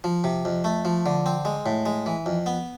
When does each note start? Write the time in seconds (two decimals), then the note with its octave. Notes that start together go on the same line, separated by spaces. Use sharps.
0.04 F3
0.24 C3
0.45 F2
0.64 A3
0.85 F3
1.06 D3
1.26 C4
1.45 G#3
1.66 A2
1.86 G#3
2.06 E3
2.26 F2
2.46 B3